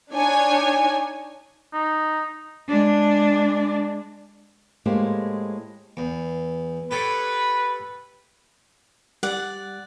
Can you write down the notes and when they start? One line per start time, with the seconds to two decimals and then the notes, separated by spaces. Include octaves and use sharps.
0.11 D4 D#4 C#5 G#5
1.74 D#4
2.68 G#3 D4
4.86 A2 G#3 A#3 G4 C5
5.97 E2
6.91 G4 A4 B4 C#5
9.23 G3 D5 F#5